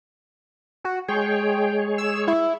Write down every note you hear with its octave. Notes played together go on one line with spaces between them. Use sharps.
F#4
G#3 G#4 C#5 G5
E6
E4